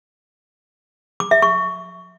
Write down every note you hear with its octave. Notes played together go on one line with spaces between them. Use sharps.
D6
E5
C#6